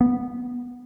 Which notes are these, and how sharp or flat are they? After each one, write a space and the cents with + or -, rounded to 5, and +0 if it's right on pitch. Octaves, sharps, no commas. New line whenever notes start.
B3 -10